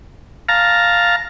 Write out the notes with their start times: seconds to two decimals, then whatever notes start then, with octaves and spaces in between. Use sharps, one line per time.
0.49 F5 A5 A#5